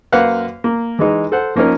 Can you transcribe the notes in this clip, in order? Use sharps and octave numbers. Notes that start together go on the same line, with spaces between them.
F#2 A#3 B4 C5 F5 F#5
A#3
E3 G#3 D#4
A4 C5 F#5
F3 A#3 C#4 D#4 A#4